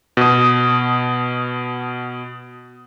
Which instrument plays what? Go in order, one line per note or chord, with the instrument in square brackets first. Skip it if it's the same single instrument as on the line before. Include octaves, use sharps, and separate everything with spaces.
[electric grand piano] B2 D#6